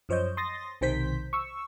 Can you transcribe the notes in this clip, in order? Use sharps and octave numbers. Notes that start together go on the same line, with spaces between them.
F#2 F3 C5 C#5 D#5 G6
C6 D#6 A6 A#6
B1 C3 D#3 C5 G6 B6
C#6 E6